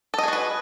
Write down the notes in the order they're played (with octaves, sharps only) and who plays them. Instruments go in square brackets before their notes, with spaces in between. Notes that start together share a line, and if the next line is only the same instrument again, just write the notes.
[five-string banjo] A4
D#5
G#4
F#4
B4